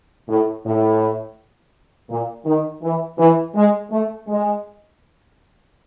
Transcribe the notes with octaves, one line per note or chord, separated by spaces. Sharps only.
A2
A2
A#2
D#3
E3
E3
G#3
A3
G#3